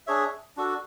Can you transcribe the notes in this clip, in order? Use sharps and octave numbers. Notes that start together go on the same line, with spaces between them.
D4 G#4 C#5 E5
D4 F#4 A4